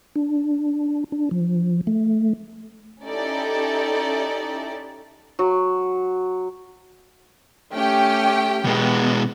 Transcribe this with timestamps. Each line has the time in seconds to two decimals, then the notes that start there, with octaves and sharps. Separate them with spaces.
0.16 D4
1.12 D4
1.31 F3
1.87 A3
3.03 C#4 D#4 E4 G4 A4 D5
5.39 F#3
7.73 A3 C#4 G4 G5
8.65 B2 G#3 B3